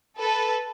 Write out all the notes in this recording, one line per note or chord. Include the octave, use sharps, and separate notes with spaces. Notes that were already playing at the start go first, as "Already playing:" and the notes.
A4 B4